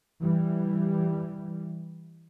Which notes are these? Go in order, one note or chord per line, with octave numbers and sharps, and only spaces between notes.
E3 G3